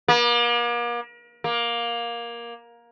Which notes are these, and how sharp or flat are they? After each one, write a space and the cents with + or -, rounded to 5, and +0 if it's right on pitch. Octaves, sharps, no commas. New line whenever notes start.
A#3 +40
A#3 +15